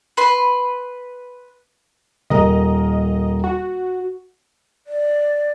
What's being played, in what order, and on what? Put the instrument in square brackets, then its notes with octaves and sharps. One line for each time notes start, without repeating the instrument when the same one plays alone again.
[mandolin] B4 C6
[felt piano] D#1 A#4 A#5 [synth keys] D#5
[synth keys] F#4
[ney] D5